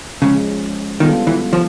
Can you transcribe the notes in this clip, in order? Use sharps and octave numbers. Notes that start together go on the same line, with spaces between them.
C#3 F3 G#3 C#4
D#3 G3 B3 D4 F4 A4
E3
F3